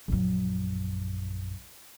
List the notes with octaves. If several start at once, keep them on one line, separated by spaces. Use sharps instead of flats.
A#1 F#2